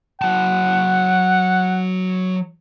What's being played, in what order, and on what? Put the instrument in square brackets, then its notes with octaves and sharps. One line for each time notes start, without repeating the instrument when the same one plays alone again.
[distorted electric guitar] F#3 A5 [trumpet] F#5